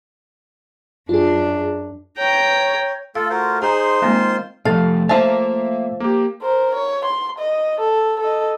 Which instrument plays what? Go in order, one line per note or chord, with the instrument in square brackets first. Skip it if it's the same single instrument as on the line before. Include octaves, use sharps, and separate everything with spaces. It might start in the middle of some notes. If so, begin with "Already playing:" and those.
[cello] F#2 D4 [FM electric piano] F4 G#4
[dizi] C#5 [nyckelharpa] G5 A#5
[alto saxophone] A3 [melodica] F4 A4 [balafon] F5
[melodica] F4 A#4 C5 [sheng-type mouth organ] F#4
[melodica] D#4 [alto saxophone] G#4 [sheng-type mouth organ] C5 C6 [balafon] A#5
[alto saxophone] D#3 [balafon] G#3 A#3 C4 [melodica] F4
[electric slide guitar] C3 F3 [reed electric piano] A3 A6 [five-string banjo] F5
[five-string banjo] F3 A5 [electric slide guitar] A#3 F5 [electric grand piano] E5
[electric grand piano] A#3 G4
[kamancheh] A#4 C5
C#5
C6
D#5
A4
A4 D#5